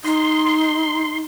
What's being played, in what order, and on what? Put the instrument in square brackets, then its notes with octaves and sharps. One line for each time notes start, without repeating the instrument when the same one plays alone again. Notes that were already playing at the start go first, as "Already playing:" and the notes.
[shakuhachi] D#4 [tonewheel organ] C6